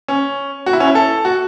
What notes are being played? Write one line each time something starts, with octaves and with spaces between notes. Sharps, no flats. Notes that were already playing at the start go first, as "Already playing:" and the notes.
C#4
F#4
E4
C#4
E4
A4
F#4